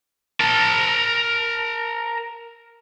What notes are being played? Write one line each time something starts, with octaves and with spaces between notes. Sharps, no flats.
A#4 A5